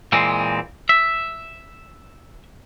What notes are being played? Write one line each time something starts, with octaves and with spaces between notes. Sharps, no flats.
A#2 E3 G#3 C4
E5